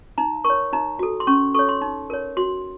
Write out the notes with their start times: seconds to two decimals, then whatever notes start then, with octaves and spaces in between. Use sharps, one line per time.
0.18 D#4 A#5
0.44 A#4 C#6
0.50 C#5
0.73 D#4 A#5
0.99 F#4 A4
1.20 C6
1.27 C#4 C#6
1.54 A4 C#5 C#6
1.69 C6
1.82 D#4
2.10 A#4 C#5
2.37 F#4 C6